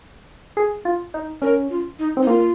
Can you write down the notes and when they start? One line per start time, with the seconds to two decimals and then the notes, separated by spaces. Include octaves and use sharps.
0.57 G#4
0.85 F4
1.14 D#4
1.42 C#4 A#4
1.70 F4
1.99 D#4
2.17 C4
2.22 D#4
2.27 A#3 F4